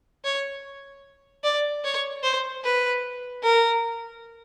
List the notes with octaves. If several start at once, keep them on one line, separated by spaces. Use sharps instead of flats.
C#5
D5
C#5
C5
B4
A#4